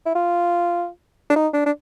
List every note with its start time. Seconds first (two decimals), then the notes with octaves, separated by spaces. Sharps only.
0.06 E4
0.15 F4
1.30 D4
1.36 D#4
1.53 D4
1.66 D4